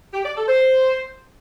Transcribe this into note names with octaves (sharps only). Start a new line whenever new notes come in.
G4
D5
A4
C5